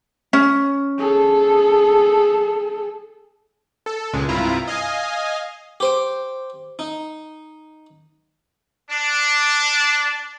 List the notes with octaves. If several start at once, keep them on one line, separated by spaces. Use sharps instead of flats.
C#4
G#4 A4
A4
C#2 A#2 G#3
C2 G2 E4 F4 A#5
D#5 F5 G#5
G4 C5 D6
D#4
D4